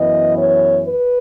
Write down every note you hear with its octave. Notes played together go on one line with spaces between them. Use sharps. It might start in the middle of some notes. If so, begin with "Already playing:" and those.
Already playing: F#2 E3 B3 D#5
C#5
B4